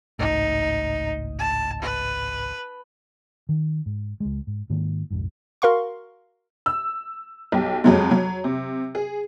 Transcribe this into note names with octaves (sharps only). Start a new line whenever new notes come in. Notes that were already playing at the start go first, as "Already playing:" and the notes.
G#1 C#2 A2 D#4
A5
B4
D#3
G#2
C#2 G#3
G#2
G#2 D#3 A#3
B1 F2 G#2
F#4 A#4 F5 C6 C#6
E6
B1 G4
F2 F#3 G#3
F#3
C3
G#4